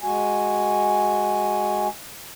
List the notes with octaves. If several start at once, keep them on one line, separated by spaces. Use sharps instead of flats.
G#3 F#4 G#5